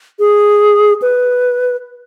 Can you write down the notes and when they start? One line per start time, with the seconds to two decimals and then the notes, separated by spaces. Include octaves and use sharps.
0.19 G#4
1.02 B4